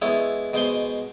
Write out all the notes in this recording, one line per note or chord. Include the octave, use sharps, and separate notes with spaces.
G#3 B3 E4 C#5
B2 G#3 C5 C6